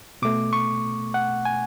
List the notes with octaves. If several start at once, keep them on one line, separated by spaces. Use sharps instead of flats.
B2 A3 D6
C#6
F#5
G#5